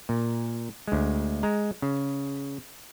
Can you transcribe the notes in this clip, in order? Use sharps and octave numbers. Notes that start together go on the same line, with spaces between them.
A#2
D2 G#3
G#3 A#5
C#3